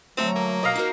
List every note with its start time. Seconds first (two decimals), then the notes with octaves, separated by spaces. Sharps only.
0.17 D2 F#3 A3 C4 A#5
0.36 A#3
0.63 B2 D#5 F5 A#5
0.75 D#4 F#4 A#4